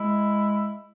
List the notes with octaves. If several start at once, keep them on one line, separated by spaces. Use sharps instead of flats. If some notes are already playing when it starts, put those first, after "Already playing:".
Already playing: G#3 E4